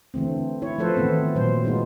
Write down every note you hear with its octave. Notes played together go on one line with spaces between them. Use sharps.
D3 E3 A3 C4
E4 C#5
F3 A3 F4 A4 B4 C5
D#3 E3 A3 B3 C4
A#2 F#3 C5
G#3 B3 D#4 F4